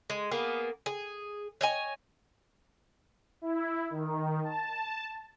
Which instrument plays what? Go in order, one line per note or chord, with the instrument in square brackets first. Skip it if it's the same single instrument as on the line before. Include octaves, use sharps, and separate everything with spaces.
[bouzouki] G#3
A#3 B3 G#4
G#4
C#5 D#5 G#5
[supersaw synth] E4
D#3
A5